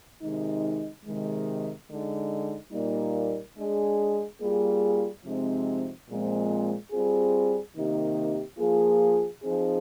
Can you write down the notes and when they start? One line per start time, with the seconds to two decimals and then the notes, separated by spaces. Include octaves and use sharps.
0.21 C3 D#3 G#3 D#4
1.05 C3 D#3 G#3
1.88 D3 G#3 D#4
2.73 A#2 G3 A#3 D#4 A#4
3.56 G#3 D4 G#4
4.40 G3 A#3 F4 G#4
5.23 C3 F3 G#3 C4 D#4
6.07 A#2 F3 G#3 C4
6.91 G3 C4 F4 G#4
7.75 C3 D#3 A#3 D#4 G4
8.58 F3 A#3 F4 G#4
9.42 F3 C4 D#4 G#4